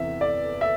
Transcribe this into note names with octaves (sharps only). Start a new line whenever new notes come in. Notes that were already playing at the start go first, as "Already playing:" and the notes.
Already playing: E2 C3 E3 B3 E5
D5
E5